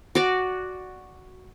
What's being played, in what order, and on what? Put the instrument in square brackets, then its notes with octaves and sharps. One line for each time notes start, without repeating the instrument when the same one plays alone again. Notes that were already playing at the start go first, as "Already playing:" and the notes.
[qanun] F#4 D5